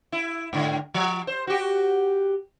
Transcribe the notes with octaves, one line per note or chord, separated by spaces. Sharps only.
E4
G#2 D3
F3
C5
F#4 G4